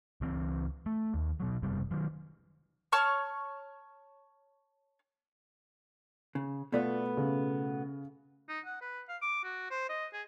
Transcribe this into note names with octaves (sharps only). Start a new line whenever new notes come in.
C#2 E3 C4
A3
D#2
B2 F#3
F#1 C3 G3
D#3 F#3
C#5 A5 C#6 F6
C#3
B2 A3 B3 F4 D5
C#3
D#4
F#5
B4
F5
D6
F#4
C5
D#5
G#4